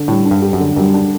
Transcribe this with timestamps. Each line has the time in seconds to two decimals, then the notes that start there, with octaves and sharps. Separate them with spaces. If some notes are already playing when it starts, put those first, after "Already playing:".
Already playing: D3
0.08 A2 G3
0.25 D4
0.31 G2
0.42 G4
0.53 F#2
0.60 D3
0.76 F#2 G3
0.94 D4